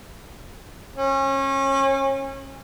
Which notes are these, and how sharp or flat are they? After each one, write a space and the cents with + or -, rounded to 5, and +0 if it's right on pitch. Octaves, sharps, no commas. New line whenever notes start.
C#4 -30